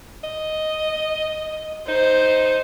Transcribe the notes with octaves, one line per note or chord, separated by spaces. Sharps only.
D#5
D#4 C5